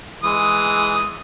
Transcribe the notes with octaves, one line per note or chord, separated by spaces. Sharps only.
E3 G#3 D#6